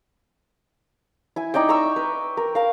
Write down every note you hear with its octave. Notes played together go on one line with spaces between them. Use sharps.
E4 G#5
D#4 D5 D#5 G5
A#5 C6 C#6 E6
B4
A#4
A#4 F5